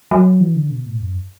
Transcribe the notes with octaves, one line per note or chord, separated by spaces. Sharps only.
F#3
E3
D3
B2
A2
F#2